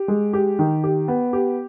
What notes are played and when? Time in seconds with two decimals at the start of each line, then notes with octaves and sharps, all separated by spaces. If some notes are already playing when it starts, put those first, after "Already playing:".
Already playing: G4
0.08 G#3
0.33 G4
0.59 D#3
0.84 G4
1.08 B3
1.33 G4